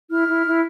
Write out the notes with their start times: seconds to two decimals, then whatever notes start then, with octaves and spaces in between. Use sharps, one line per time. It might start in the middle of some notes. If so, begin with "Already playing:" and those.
0.10 E4 F6
0.27 E4
0.46 E4